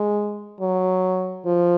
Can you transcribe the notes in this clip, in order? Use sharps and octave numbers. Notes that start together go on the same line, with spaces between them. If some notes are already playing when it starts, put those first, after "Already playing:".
Already playing: G#3
F#3
F3